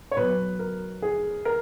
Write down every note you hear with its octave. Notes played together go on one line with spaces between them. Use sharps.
C#5
B2 F#3 B3 B4
A#4
G#4
A#4